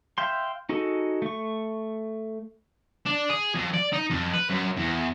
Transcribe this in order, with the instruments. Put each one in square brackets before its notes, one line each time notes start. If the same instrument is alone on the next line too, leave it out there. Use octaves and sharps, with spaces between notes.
[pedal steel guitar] E5 F5 G5 C6
D#4 F#4 G#4 A4
A3 C#6
[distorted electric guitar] D4
G#4
F2
D5
D#4
F2
B4
F#2
E2